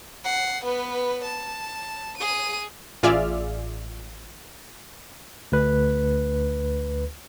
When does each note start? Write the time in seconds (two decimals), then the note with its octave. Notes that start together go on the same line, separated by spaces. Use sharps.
0.24 F#5 C7
0.64 B3 B4
1.24 A5
2.17 G#4 D#7
3.03 A1 F4 G#4 D5 E5 F6
5.52 D2 B4